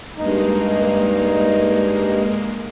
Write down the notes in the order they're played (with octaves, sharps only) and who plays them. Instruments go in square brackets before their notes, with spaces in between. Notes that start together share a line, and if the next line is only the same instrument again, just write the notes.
[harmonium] G2 D#4 [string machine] G#3 A#3